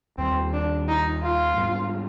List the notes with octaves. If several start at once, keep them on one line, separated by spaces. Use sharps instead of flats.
D#2 D#3 G3 C4
D4
D#4
F4
G#2 G3 B3